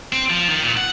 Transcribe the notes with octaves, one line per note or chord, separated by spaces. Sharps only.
C4
F3
D#3
A#2
F#5